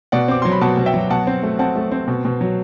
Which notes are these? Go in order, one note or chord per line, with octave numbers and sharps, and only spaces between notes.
B2 D5 F#5
C4 D6
F#3 C6
B5
B2 F#5 A5
B2
E5 G5
F#3
B2 F#5 A5
C4
A3
C4 F#5 A5
A3
C4
B2
B2
F#3